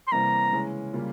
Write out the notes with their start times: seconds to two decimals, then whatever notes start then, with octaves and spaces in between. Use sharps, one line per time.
0.07 C6
0.12 C3 E3 G3 A#3 A#5
0.52 C#3 E3 G#3 C#4
0.93 C#3 G3 A#3 F4